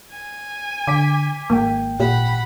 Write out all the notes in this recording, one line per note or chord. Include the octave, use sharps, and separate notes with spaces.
G#5
D3 D6 B6
G#1 A#3 G5
A#2 G4 F#5 B5